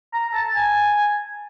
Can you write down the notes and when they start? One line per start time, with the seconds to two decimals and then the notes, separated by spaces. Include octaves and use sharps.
0.13 A#5
0.33 A5
0.55 G#5